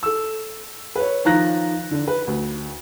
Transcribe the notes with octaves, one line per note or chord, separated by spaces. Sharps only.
A4 E6
B4 C#5
D#3 F3 A#5 F#6 A#6
D3 D4
B4
D2